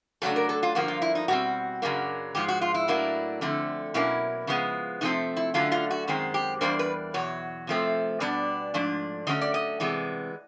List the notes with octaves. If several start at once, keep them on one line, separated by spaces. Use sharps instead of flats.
C#3 F#3 A3 D4 A4
A#4
A4
F4
G2 D3 F3 A#3 F#4
F4
E4
D#4
B2 G3 C4 F#4
F#2 C#3 F#3 A#3 D4
G#2 F3 G#3 G4
F#4
F4
E4
A2 F#3 A#3 D4
D3 F3 A3 C4
B2 F#3 A#3 C#4 E4
C#3 F3 G#3 B3
C3 F3 A3 C4 D#4
E4
D3 F#3 A3 C#4 F4
F4
F#4
F#2 D#3 G#3 C4
G4
E2 B2 G3 A#3 D4 C5
B4
E2 B2 F#3 C#5
C3 F3 A3 C4
B2 G3 B3 D4 D5
G#2 F3 A3 D4
D3 F#3 A3 C#4 D#5
D5
D#5
C3 E3 G#3 B3